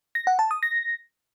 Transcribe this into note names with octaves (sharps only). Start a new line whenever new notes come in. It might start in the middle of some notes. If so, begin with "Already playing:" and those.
A#6
F#5
A5
D#6
A#6